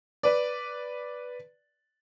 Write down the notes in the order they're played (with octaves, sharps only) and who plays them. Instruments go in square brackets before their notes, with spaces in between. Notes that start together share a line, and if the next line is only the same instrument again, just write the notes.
[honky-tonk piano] B4 D5